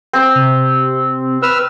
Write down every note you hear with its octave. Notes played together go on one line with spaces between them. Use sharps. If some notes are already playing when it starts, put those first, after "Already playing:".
C4
C3
B4 E6 F6